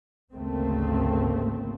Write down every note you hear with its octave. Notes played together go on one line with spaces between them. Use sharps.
G#1 D2 C#3 A3 A#3 C4